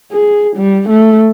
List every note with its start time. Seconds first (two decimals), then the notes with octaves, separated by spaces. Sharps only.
0.12 G#4
0.56 G3
0.89 A3